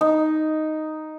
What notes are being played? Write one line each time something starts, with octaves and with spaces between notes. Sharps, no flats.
D#4